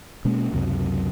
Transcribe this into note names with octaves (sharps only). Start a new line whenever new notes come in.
B2 G#3 A#3 C#4
C#2 F#2 C3 F#3